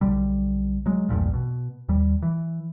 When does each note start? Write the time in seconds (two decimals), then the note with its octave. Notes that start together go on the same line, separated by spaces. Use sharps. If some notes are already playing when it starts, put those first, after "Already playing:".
0.01 B1 D3 G3
0.86 F#3 G#3
1.09 A#1 E2 G2 A#2
1.34 B2
1.89 D#2 G3
2.22 E3